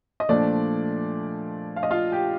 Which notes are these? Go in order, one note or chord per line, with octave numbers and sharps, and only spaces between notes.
D#5
A#2 F3 A3 D4 D5
F5
D#5
F4 F5
G4 G5